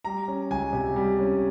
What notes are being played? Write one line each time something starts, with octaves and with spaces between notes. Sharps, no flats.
G3 A#5
C#4
C#2 G#5
C3
G3
C#4